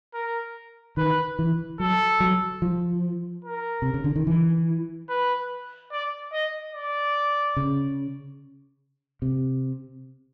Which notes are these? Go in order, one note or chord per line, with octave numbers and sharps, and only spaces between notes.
A#4
D#3 B4
E3
F#3 A4
F#3
F3
A#4
C3
C#3
D3
D#3
E3
B4
D5
D#5
D5
C#3
C3